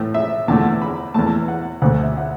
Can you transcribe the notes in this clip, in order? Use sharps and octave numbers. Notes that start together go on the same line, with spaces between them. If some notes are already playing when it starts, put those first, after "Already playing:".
Already playing: A2 E3 A3
E5
E2 D3 A3 A5
B5
E2 E3 A3 A5
F#5
D2 D3 A3 F#5
E5
F#5